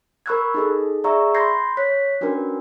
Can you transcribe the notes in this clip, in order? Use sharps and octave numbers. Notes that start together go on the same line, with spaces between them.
A#4 B5 C#6 E6 F#6 G#6
D#4 G#4 A4
G#4 D5 E5 A#5 C#6 E6
B5 C6 G6 G#6 A#6 C7
C#5 F#6 B6
C#4 D4 F#4 A#4 B4